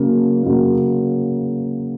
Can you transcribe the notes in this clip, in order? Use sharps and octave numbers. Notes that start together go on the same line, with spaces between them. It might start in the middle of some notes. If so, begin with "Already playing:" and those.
Already playing: C#3 F#3 A#3
C#3 F#3 A#3